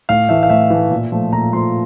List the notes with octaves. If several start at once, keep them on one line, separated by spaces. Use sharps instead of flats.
A2 F5
E3 A3 E5
F5
A2 E5
E3 A3
A#2
F3 A3
A#2 A#5
F3 A3 C6